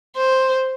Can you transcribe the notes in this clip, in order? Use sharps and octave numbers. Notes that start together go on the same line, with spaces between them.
C5